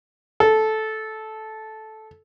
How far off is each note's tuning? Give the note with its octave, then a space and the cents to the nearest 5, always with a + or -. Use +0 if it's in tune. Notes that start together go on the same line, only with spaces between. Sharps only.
A4 -10